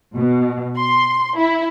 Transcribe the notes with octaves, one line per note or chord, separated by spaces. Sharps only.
B2
C6
E4